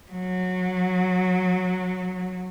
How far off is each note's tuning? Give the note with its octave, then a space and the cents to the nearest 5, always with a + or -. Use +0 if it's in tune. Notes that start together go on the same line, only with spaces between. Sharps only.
F#3 -15